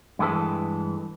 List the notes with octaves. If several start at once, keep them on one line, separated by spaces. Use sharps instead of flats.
G2 E3 G#3 A4 B4